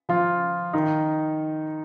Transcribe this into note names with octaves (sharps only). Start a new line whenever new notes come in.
F3 F4
D#3 D#4